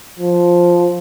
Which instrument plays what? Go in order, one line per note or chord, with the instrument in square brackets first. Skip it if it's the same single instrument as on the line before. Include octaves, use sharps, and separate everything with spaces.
[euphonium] F3